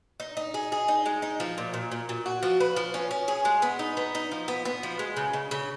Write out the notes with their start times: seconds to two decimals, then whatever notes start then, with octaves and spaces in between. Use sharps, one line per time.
0.20 D#4
0.37 D#4
0.54 G#4
0.72 G#4
0.88 D#4
1.06 G#3
1.22 D#4
1.40 F3
1.58 A#2
1.74 A#2
1.92 A#2
2.09 A#2
2.26 F#4
2.43 F3
2.60 B4
2.76 F3
2.94 C#4
3.11 C#4
3.28 G#4
3.45 G#3
3.62 B3
3.79 D#4
3.97 B3
4.15 D#4
4.32 F3
4.48 B3
4.65 B3
4.83 F3
4.99 G#3
5.17 C#3
5.33 C#3
5.51 C#3